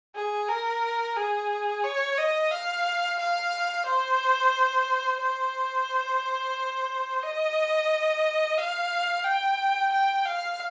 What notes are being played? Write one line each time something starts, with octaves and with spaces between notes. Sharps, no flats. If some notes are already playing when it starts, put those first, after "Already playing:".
G#4
A#4
G#4
C#5
D#5
F5
F5
C5
C5
D#5
F5
G5
G5
F5